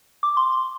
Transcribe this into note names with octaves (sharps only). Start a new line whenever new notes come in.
D6
C6
C6